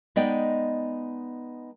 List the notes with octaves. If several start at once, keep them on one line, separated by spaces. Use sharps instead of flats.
G#3 B3 D#4 D5 D#5 G5